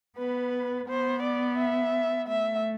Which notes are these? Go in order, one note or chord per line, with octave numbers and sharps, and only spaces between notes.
B3 B4
B3 C5
D5
E5
A3 E5